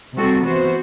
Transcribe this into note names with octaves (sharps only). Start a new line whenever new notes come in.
C3 G3 C4 F#4 A4
E3 B3 F#4 C5